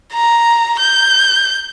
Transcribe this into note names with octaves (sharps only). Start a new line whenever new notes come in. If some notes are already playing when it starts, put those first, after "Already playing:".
A#5
G6